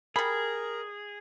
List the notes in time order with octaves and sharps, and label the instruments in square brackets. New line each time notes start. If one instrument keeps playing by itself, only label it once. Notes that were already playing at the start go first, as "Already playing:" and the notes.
[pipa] G3 B5 [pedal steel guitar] G#4 [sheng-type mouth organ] A#4